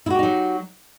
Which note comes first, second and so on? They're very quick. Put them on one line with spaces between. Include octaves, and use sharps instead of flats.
E4 F#4 G4 D#4 F#3